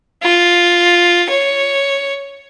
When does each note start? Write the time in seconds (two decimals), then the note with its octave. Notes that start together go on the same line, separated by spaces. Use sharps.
0.23 F4
1.30 C#5